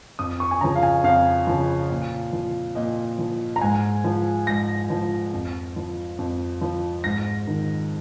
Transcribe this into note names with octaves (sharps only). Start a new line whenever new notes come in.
F2 D#6
C#6
G#5
C#3 F3 A#5
F5
G#5
F2 F5
C#3 F3
A#2
F3
A#2 D#5
F3
A#5
G#2 G#5
F3
G#2 A#6
F3
F2
F3
F2
F3
G#2 A#6
D#3